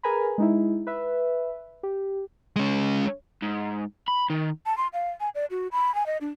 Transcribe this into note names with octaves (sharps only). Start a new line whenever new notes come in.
G#4 A#4 B4 G#5 A#5 B5
G#3 D#4 E4
B4 E5
G4
G#3 C#4
G#2
B5
D#3
A5
C6
F5
G#5
D5
F#4
B5
G#5
D#5
D4